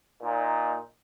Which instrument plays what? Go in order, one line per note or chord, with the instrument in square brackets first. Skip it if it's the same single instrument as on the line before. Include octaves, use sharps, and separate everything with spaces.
[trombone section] A#2 D#4